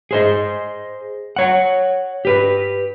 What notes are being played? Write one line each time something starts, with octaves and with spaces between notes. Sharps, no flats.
G#4 C5 D#5
C#5 F#5
G4 B4